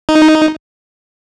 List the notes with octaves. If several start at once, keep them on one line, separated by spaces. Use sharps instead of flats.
D#4